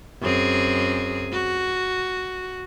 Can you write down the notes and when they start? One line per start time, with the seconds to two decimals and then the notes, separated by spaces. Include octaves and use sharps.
0.21 F#2 C4 G#4
1.32 F#4